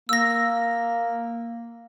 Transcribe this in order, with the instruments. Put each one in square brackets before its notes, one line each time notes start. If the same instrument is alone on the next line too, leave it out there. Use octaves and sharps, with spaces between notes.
[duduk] A#3 [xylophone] E6 A#6